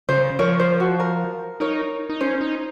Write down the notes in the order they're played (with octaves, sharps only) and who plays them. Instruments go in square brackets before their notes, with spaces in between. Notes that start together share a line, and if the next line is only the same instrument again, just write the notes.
[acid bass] C#3 [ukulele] C5
[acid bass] F3 [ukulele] A#4 C#5
[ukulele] C5
F#4
A#4
[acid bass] D#4 [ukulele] A#4 C#5
[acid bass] D#4
[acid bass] C#4 [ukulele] C5
[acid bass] D#4